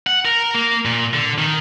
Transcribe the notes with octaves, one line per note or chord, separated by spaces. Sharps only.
F#5
A#4
A#3
A#2
D3
D#3